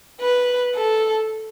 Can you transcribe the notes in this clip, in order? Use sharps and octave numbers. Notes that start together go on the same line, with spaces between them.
B4
A4